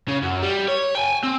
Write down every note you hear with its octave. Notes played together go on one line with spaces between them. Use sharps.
C#3
F#2
G3
C#5
G5 G#5
C4